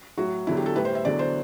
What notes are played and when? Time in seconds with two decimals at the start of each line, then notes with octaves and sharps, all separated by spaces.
0.18 A2 F#3 F#4
0.47 E2 D3 F#3 E4
0.57 G4
0.66 A4
0.75 A2 G3 B4
0.85 C5
0.95 E5
1.05 E2 D3 F#3 D5
1.19 C5